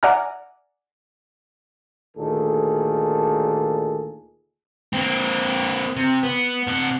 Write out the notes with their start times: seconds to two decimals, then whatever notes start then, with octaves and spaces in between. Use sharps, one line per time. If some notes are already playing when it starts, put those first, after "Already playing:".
0.03 D5 E5 F#5 G#5 A#5 F6
2.16 D2 A#2 D#3 G#4 A4
4.93 A#3 C4
5.97 C3
6.23 B3
6.67 C3 F#5